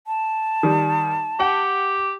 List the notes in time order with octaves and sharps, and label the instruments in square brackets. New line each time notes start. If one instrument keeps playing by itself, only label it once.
[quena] A5
[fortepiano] D#3 G3
[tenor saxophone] G4 [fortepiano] F#5 G5